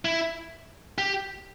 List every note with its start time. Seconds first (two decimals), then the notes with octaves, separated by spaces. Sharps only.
0.05 E4
0.98 G4